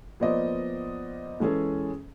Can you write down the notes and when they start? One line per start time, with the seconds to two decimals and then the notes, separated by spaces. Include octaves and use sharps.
0.20 F3 A#3 B3 C5 D5 D#5
1.40 E3 G#3 C#4 G#4 A4